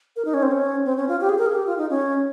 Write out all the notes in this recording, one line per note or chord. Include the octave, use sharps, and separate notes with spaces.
A#4
D#4
C#4
C4
C#4
C4
C#4
F4
G4
G#4
A#4
G#4
G4
F4
D#4
C#4